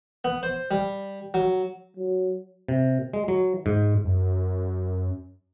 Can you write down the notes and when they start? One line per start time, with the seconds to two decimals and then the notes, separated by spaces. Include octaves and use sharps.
0.25 B3
0.43 C5
0.71 G3
1.34 F#3
1.97 F#3
2.68 C3
3.13 G#3
3.28 F#3
3.66 G#2
4.05 F#2